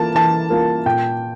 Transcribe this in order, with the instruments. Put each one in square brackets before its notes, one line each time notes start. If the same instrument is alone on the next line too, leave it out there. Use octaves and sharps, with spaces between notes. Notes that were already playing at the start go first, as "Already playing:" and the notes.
Already playing: [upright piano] E3 A#3 F4 A#4 [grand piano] A5
[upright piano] E3 [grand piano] A5
[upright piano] A#3 F4 A#4
[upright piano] A#2 [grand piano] G5